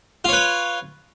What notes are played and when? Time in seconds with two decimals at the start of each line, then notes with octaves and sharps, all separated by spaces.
0.25 F4
0.29 C#5
0.33 B4